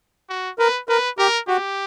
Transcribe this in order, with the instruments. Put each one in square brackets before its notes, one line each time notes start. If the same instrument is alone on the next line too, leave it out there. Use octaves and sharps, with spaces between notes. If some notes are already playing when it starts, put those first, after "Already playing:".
[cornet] F#4
[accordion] A#4 [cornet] B4
[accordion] A#4 [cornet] B4
[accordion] G4 [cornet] A#4
[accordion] F#4 [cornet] G4